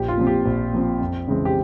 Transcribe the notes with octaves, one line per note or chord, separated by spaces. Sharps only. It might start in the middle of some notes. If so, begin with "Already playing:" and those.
Already playing: A#1 G4
F4
A#2 F3 C4
G4
A#1
A#2 F3 C4
F2
C#3 E3 G#3 C4
G4